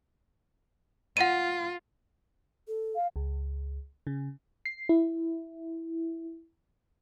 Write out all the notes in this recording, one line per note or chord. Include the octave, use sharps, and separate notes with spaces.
F4 F#5 D#7
A4
F5
C#2
C#3
C7
E4